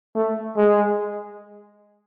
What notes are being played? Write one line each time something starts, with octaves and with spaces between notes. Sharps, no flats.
A3
G#3